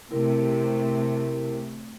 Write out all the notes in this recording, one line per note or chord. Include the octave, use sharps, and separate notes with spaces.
C3 A3 E4 A#4